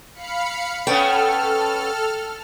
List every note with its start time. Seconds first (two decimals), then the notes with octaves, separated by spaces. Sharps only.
0.14 F5 B5 C#7
0.87 A3 B3 C#4 A4 G5 F6